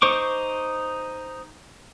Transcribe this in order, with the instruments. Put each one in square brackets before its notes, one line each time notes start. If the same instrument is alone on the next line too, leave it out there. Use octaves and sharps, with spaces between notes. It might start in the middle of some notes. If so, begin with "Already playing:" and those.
[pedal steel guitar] D#4 C5 C#6 D6